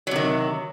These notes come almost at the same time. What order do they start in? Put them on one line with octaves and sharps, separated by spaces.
F#3 C3 D#3